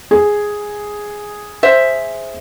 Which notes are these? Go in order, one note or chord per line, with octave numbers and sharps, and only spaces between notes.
G#4
C5 E5